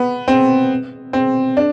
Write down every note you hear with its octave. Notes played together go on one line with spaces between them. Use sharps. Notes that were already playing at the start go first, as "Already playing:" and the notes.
Already playing: B3
C4
C4
D4